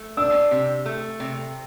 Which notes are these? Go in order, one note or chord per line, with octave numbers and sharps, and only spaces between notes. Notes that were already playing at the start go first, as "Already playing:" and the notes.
Already playing: A3
D4 E6
C3
A3
C3